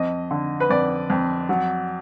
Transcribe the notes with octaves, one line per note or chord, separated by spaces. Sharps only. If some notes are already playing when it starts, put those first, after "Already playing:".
Already playing: F2 D#5
D3
B4
F2 D5
F2
F#3